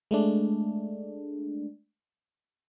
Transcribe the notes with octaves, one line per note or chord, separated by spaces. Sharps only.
G#3 A3 D4